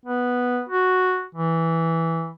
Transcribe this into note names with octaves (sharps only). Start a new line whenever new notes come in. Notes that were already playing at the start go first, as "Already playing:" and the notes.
B3
F#4
E3